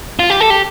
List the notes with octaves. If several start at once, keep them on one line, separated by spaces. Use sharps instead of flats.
F4
G4
A4
G4